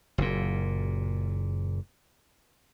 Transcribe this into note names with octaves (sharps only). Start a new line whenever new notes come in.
F#1 A#2